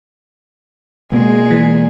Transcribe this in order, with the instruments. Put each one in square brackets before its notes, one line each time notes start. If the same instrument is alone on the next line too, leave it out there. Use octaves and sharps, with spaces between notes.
[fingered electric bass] B2 A#3 B3 [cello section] G#3 [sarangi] G#4
[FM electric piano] E3